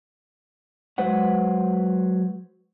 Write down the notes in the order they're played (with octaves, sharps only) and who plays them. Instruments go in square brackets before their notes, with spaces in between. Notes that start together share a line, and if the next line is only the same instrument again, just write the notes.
[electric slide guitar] F#3 G#3 B4 C5 F#5